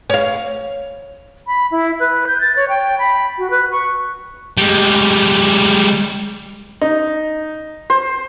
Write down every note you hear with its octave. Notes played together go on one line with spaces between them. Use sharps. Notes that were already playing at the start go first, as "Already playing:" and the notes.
C#5 F5
B5
E4
B4
G6
A6
C#5
G5
B5
F#4
B4
C#6
G3 G#3
D#4
C5